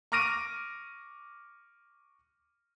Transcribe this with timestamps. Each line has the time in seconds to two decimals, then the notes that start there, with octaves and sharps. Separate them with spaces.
0.12 C#6 D6 F6 A#6 D7 D#7